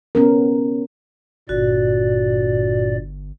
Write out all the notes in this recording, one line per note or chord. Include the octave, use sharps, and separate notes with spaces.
B3 C#4 A#4
G1 G2 A#2 F#4 D5